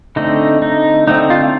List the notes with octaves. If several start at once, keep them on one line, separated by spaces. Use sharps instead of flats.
D3 A3 C4 D#4
D#4
D3 A3 C4 D#4
F4